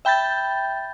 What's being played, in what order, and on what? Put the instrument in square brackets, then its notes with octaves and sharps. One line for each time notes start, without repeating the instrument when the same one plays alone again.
[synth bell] E5 G5 B5 G6 A6